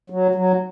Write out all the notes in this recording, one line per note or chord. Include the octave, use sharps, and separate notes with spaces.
F#3
F#3